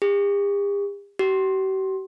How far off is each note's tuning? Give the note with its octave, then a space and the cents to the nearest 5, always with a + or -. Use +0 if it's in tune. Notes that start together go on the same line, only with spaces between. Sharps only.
G4 +45
G4 -45